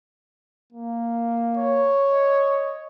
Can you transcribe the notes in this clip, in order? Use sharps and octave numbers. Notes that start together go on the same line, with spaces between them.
A#3
C#5
D#5